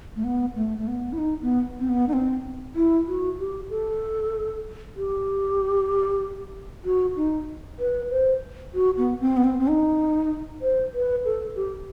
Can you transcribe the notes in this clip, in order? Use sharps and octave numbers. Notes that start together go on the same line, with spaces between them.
A3
B3
A3
A3
B3
E4
D#4
B3
C4
B3
D#4
C4
E4
F#4
G4
A4
G4
F#4
D#4
B4
C5
F#4
B3
C4
B3
C4
C4
D#4
C5
B4
A4
G4